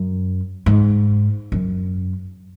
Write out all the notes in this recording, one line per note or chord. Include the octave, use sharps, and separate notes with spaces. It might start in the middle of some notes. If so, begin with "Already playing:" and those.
Already playing: F#2
G#2
F#2